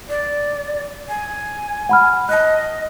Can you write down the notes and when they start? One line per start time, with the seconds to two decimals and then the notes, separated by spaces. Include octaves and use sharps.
0.09 D5
1.09 G#5
1.89 F#5 B5 F6
2.29 D#5 A5 F#6